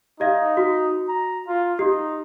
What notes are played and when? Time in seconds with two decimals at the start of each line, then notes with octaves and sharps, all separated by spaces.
0.20 D#4 G4 D#5 F5
0.57 F#4
1.08 A#5
1.47 F4
1.79 D#4 G4